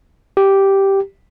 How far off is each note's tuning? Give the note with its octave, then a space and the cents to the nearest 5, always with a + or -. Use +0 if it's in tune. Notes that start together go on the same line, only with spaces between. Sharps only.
G4 -5